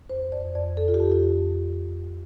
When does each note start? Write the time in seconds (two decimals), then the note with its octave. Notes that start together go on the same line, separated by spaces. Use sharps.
0.10 F2 C5
0.32 F2 D5
0.55 F2 D5
0.77 F2 A4
0.88 F4
0.94 G4
1.00 F2
1.12 F4